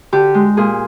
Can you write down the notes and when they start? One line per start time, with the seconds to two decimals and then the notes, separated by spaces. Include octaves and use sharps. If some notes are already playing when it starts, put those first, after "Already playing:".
0.12 D3 G4
0.34 G#3
0.57 A#2 G#4